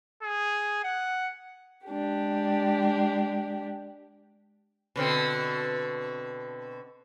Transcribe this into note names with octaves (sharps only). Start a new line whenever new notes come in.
G#4
F#5
G#3 D4 G4
B2 D3 C4